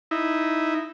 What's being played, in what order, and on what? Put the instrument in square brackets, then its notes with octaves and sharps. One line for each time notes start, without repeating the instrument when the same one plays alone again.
[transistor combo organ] D#4 E4